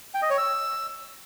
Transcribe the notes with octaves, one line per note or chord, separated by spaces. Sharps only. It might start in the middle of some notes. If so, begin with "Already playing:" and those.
G5
D#5
C#5
E6